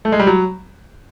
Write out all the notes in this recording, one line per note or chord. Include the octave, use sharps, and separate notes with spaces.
A3
G#3
G3
F#3